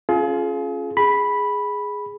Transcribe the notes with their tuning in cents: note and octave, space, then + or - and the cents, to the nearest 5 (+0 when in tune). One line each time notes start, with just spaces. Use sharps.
C#4 -15 F4 +0 G#4 +35
G#4 +0 B5 -5